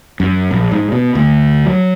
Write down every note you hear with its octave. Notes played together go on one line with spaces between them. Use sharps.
F#2
A#1
G#2
B2
D2
F#3